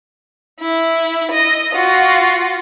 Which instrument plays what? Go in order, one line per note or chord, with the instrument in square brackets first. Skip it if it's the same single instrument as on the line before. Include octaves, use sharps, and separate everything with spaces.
[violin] E4
D#5
F4 F#4